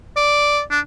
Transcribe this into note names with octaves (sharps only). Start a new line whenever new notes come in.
D5
D4